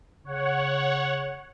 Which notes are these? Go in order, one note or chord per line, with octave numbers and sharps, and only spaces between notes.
C#3 C#5 F#5